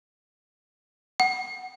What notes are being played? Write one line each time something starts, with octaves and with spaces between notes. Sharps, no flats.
F#5